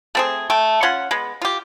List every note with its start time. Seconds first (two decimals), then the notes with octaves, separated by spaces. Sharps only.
0.15 A3 C4 G#4
0.50 A3 G5
0.83 C#4 F4 F#5 C6
1.11 G#3 B3
1.42 F4 G4